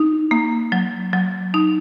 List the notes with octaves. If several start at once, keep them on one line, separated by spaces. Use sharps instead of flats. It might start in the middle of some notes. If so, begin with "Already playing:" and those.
Already playing: D#4
A#3
F#3
F#3
D#4